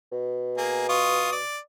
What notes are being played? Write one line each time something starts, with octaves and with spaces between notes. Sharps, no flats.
B2
A#3 G#4
F4 C#6 D#6
D5